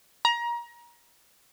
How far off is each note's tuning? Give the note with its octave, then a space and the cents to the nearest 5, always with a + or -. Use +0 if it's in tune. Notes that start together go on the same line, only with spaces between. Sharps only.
A#5 +25